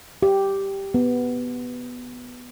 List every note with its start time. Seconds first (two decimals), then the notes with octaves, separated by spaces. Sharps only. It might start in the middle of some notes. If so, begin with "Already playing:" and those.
0.23 G4
0.94 B3